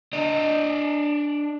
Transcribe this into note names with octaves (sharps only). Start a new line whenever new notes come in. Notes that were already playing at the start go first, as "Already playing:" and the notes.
D4 D#5